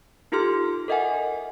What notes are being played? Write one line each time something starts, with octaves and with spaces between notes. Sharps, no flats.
D#4 F4 G4 A4 C6 F6
A4 A#4 D#5 E5 F#5 G#5